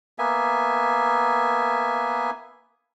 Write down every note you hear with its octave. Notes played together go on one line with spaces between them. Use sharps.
A#3 B3 E5 G#5